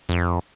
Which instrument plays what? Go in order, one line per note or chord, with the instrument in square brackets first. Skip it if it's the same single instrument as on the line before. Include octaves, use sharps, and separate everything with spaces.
[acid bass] F2